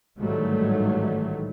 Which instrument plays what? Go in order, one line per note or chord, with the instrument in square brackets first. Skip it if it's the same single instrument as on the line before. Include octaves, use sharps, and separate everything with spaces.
[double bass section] A1 G#2 D#3 F#3 G3 A3